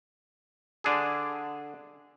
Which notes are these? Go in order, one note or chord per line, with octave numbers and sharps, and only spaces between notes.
D3 D4 G#4